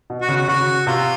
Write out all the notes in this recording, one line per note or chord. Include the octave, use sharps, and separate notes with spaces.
B2
F#4
C#3
F#4
C#3 F#4
C3 F4